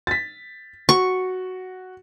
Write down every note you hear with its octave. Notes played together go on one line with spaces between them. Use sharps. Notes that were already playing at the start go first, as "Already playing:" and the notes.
A6 B6
F#4 C#6